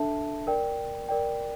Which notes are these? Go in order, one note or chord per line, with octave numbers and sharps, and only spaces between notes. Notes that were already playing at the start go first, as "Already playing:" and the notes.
Already playing: D4 A4 E5 A5
A#4 D5 G5
A#4 D5 G5